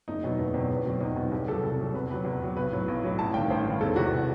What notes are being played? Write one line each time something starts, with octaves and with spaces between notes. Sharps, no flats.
F#1 D#4
E2 B2 F#3
F#1 B3
E2 B2 F#3 C4
E2 B3
B2 F#3 C4
E2 D#4
B2 F#3
C2 G4
C3 F#3 A4
C2
C3 F#3
E2 B4
C3 F#3 B4
E2
C3 F#3
B1 B4
A2 F#3
B1
A2 F#3
A1 A5
G2 D#3 G5
A1 C5
G2 D#3
E1 A4
E2 C3 E3 F#4